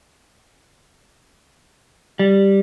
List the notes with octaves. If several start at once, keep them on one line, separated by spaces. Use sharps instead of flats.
G3